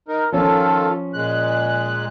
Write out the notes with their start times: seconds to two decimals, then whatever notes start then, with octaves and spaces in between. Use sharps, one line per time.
0.08 D#4 A#4
0.32 D#3 F3 C#4 F4 A4
1.14 A#2 G#3 F#6